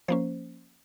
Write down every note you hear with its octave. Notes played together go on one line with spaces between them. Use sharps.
F3 A#3 C#4 C5